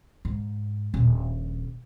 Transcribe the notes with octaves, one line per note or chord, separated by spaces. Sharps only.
G#2
D#1 A#1